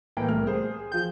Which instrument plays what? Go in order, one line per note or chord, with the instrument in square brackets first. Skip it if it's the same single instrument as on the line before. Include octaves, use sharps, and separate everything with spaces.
[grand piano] A2 E3 A#3 [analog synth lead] G5
[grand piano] C2 A#4 F6 [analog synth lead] A3
[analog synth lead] G#4 [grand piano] C5
[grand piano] F3 G5 [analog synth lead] G6